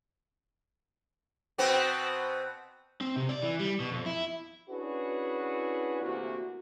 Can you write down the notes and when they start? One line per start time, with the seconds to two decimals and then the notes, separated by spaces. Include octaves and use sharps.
1.58 B2 B3 C4
3.01 C4
3.16 C3
3.29 D5
3.42 E3
3.60 G3
3.80 B2
3.92 F2
4.06 E4
4.69 C#4 D4 E4 F#4 G#4 B4
6.00 D2 C3 E3 A#3 F#4